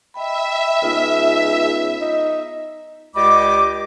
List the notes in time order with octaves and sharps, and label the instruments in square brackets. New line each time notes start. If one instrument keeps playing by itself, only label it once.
[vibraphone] D#5 G5 B5 [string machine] E5
[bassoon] C#2 [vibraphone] B3 D#4 F4
[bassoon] D#4
[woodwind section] C#2 G4 D5 D#5 B5 D6